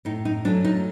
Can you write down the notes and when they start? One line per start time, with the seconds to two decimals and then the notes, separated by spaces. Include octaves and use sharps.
0.05 A2 D#4
0.25 D#4
0.45 F#3 A3 C#4 D4
0.65 D#4